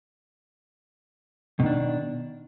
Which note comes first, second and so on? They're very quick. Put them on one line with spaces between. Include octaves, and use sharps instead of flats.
B2 D#3 D4